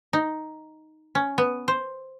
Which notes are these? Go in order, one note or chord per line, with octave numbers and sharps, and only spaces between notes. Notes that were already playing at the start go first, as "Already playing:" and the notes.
D#4
C#4
B3
C5